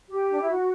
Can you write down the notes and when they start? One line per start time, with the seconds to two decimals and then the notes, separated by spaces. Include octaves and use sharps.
0.09 G4
0.31 D4
0.40 E4
0.49 F#4